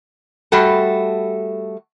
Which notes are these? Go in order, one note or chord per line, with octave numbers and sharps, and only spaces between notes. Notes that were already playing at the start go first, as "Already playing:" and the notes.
G3 A3 F#4 A4